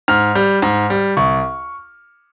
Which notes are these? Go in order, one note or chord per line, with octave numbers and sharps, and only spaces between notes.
G#2 F6
G3
G#2
G3
C2 C#6